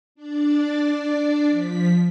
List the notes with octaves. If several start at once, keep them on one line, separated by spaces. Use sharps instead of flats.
D4 D5
F3 B6